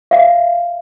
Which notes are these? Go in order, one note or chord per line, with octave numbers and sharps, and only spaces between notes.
E5 F5